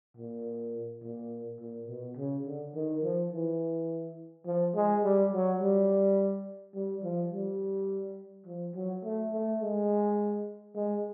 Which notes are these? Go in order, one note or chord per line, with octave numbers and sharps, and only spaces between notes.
A#2
A#2
A#2
B2
C#3
D3
D#3
F3
E3
F3
G#3
G3
F#3
G3
G3
F3
G3
F3
F#3
A3
A3
G#3
G#3